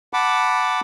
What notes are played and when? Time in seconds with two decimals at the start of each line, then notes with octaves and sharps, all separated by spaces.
0.13 F#5 A5 B5 D6